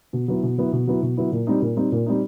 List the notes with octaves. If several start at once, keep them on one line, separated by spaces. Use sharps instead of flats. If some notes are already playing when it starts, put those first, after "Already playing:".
B2
F#3 B3 E4
B2
F#3 B3 E4
B2
F#3 B3 E4
B2
F#3 B3 E4
A#2
G3 C4 D#4
A#2
G3 C4 D#4
A#2
G3 C4 D#4